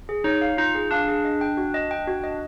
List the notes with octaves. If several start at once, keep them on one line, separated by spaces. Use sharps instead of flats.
G#4
D#4 C#5
F5
D#4 F4
G#4
D4 F5
G#4
D#5
G5
F#4
D#5
G5
F#4
D#5